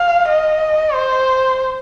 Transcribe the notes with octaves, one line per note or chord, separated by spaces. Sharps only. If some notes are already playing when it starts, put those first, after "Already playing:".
Already playing: F5
D#5
C5